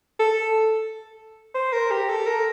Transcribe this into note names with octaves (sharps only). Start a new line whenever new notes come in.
A4
C5
A#4
G4
A4
A#4